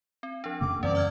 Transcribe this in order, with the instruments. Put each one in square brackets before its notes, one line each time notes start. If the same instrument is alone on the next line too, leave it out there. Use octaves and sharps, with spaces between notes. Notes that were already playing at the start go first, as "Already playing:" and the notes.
[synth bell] C4
F3 D4
[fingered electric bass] F2 C#3 A#3 [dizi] D6
[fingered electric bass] F#2 E3 C4 [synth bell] G3 C#4 [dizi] D5
[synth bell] D6 F6 G#6